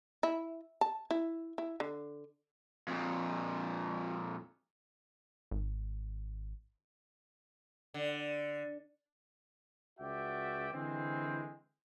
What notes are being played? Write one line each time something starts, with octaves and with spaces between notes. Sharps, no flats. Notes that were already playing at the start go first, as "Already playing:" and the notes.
E4
A5
E4
E4
D3
F2 A#2
G#1
D3
C#2 F#4 D5 E5 G5
D3 E3 G#3 C4